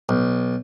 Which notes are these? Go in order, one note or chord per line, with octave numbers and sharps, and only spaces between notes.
B1